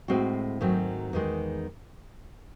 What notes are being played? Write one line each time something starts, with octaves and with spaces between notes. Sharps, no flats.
A2 G#3 C4 F#4
G#2 D#3 F#3 A3 C4
E2 D#3 G#3